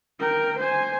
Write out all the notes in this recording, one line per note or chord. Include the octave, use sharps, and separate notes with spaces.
A#4 G5
C5 G#5